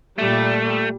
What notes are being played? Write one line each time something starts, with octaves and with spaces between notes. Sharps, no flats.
A#2 G3 A3